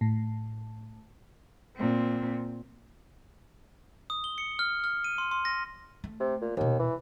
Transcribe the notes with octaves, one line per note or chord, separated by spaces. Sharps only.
A2
A#2 C4
D#6
G7
C#7
F6
F6
D#7
C6
C6
A#6
A3
C3
A#2
D#1 D#2 B2
E3